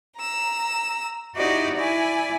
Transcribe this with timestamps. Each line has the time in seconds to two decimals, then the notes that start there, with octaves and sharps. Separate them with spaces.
0.18 A#5 E6
1.35 D#4 E4 F#4 G4 D5 D#5
1.75 E4 D5 G#5